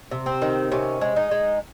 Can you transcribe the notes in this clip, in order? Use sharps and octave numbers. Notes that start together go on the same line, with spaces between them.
C3
C4
D#3
C3 C#4
G#3
D#4
G#3